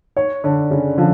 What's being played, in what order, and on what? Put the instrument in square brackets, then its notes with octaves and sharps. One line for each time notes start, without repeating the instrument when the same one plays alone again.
[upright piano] C#5
[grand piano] D3 [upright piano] C#5
[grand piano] C#3 [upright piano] C#4
[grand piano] D3 [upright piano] F3